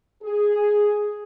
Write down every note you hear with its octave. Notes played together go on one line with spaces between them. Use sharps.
G#4